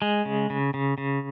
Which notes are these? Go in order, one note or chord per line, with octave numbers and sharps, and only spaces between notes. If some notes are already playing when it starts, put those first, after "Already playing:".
G#3
C#3
C#3
C#3
C#3